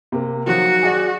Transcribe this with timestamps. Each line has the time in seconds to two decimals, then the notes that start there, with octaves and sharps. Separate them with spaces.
0.12 C3 A#3
0.47 D#3 F3 F#3 F#4
0.83 G#4 D5